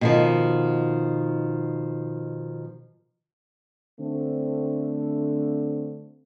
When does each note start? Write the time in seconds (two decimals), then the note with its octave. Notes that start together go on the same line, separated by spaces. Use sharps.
0.01 B2 D#3 F3
4.00 D3 A3 C4